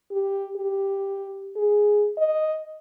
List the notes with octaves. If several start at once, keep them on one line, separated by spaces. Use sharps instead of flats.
G4
G4
G#4
D#5